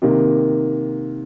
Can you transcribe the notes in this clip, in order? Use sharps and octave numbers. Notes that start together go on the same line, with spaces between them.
C3 D#3 A#3